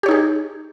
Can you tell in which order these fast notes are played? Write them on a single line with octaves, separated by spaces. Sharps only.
G4 C#5 D#4 G#4